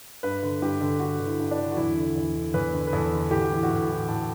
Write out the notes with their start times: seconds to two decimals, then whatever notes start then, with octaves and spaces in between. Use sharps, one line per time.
0.23 G2 B4
0.43 D3
0.62 G2 G4
0.81 D3
1.00 G2 F#4
1.19 D3
1.26 E4
1.39 G2
1.51 D4
1.59 D3
1.72 F#4
1.77 E2 E4
1.97 D3
2.16 E2
2.35 D3
2.54 E2 B4
2.73 D3
2.87 B4
2.92 E2 A4
3.13 D3
3.31 A2 G4
3.41 F#4
3.51 E3 E4
3.63 F#4
3.71 A2
3.89 E3
4.08 A2 A4